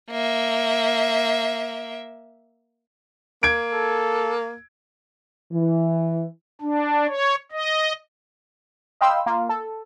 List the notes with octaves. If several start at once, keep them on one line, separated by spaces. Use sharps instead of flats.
A#3 E5
A#3 G#6 D7
A4
E3
D4
C#5
D#5
D#5 F5 G5 B5 C6 E6
A#3 F4
A4